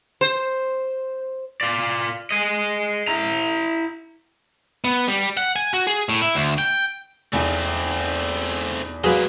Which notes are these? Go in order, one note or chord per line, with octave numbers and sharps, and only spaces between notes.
C5
F4 D5
G#4 D#5
E4 A#5
B3
G3
F#5
G#5
F#4
G#4
A2
E4
D2
G5
B1 E2 A3 C4
F#3 G#3 A#3 G#4 B4 F5 E7